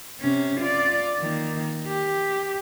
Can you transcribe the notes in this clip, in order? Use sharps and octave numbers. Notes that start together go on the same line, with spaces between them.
C3 C#4
F4 D5
D#3 A#3
G4